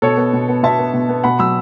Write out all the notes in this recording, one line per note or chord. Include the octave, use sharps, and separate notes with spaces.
B2 A4 C#5
B3
B2
B3
B2 E5 A5
B3
B2
B3
B2 F#5 B5
F#3 B5 E6